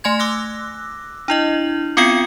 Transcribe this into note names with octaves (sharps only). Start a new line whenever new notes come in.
A3 G#5 C6 G#6
D6 E6 F#6 A#6
D4 E4 D#5
B3 C4 F4 F5 G5 C#7